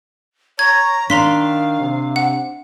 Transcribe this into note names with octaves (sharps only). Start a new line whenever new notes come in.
C#5 A#5 G#6
D#3 D4 F5 A#5 C6 B6
C3
F#5